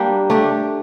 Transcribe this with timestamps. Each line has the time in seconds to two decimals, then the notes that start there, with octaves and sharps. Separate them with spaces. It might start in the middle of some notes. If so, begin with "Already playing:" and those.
Already playing: G3 A#3 D4 G4
0.30 A3 D4 G4